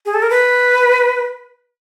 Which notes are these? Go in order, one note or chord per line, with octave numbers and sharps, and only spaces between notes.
G#4
A4
A#4
B4